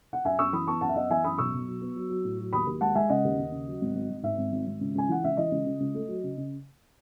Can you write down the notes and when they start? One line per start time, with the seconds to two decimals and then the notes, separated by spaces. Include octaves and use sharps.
0.13 F#5
0.24 F#2 E5 G#5
0.39 F#2 C#6 E6
0.53 E3 B5 D#6
0.67 B3 A5 C#6
0.81 F#2 F#5 A5
0.89 E5
0.96 B3 D#5 F#5
1.10 E3 E5 G#5
1.24 F#2 B5 D#6
1.38 B1 C#6 E6
1.53 B1
1.68 F#3
1.82 B3
1.96 F#3
2.10 F#3
2.24 A2
2.39 F#3
2.53 D#2 B5 D#6
2.67 D#2
2.81 G#3 F#5 A5
2.95 G#3 E5 G#5
3.09 C#3 D#5 F#5
3.25 D#2
3.39 D#2
3.52 C#3
3.67 F#3
3.81 G#1
3.95 G#1
4.10 G#1
4.23 G#2 E5
4.38 G#1
4.52 G#1
4.67 G#1
4.81 C#2
4.95 C#2 G#5
5.09 E3 F#5
5.23 C#2 E5
5.37 E3 D#5
5.51 C#2
5.66 C#3
5.80 C#2
5.94 A3
6.08 F#3
6.24 C#3
6.38 C#3